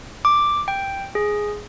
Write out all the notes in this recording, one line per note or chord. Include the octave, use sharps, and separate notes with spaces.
D6
G5
G#4